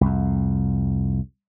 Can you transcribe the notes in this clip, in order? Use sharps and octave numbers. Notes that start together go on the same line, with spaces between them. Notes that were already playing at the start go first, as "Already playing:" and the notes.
C2 F2